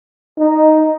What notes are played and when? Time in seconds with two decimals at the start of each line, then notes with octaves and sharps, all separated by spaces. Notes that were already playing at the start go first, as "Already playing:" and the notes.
0.39 D#4